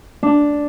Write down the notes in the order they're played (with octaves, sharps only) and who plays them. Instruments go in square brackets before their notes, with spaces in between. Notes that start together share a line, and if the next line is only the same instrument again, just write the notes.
[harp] D4